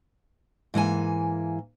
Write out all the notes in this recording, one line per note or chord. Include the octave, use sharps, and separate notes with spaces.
G#2 E3 A#3 G#5